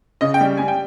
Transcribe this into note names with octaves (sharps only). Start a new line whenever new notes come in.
C#3 D#5
G5
G3
G3 G#5
G5